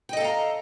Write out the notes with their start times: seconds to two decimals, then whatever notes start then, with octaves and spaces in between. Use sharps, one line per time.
0.09 G5
0.13 D#5
0.17 A4
0.21 F5
0.24 A#5